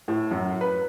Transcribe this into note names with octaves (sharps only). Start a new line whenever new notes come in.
A2
F#2
B4